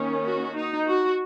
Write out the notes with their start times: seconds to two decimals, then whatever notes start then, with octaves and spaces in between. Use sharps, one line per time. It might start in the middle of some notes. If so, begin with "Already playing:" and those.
Already playing: D#3 A#3 C#4
0.24 F#4
0.55 D#4
0.87 F#4